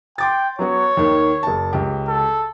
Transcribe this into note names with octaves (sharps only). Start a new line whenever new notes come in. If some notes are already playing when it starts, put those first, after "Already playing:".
G5 C6 D6 A6
F#3 B3 F#4 C#5
D#2 D#3
F#1 A5
C#2 G4
A4